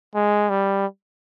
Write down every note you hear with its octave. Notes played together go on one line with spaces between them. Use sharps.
G#3
G3